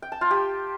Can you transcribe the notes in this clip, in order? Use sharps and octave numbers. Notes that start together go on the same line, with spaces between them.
G5
A5
F4
G4